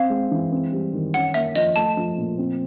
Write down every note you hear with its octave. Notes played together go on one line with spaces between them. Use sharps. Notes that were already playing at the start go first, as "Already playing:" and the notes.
Already playing: C4 F5
G#3
E3
C4
G3
D#3
C#4 F#5
A#3 E5
F3 D#5
A3 A5
F3
A#2
C4